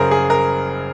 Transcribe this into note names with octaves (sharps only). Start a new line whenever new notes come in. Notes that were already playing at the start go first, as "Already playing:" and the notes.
Already playing: F#1 F#2 C#3 G#4 A#4 C5
G#4
A#4